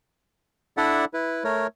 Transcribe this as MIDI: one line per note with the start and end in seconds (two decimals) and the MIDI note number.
0.77 1.05 62
0.77 1.05 64
0.77 1.05 69
0.77 1.05 74
0.77 1.05 76
0.77 1.05 78
1.14 1.44 64
1.14 1.44 71
1.44 1.67 57
1.44 1.67 70
1.44 1.67 73